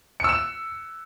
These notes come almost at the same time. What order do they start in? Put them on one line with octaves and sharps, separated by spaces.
C#7 E6 E7